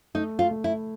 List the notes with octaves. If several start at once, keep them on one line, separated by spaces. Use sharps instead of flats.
A3 D#4
F4
A3
E4